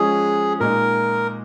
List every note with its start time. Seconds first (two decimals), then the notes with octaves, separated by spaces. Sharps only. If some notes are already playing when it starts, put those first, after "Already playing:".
Already playing: F3 G#3 C#4 F4 G#4
0.60 A#2 G#3 D#4 A#4